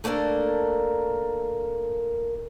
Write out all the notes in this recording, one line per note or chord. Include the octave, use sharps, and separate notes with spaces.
A3 A#3 D4 A4 A#4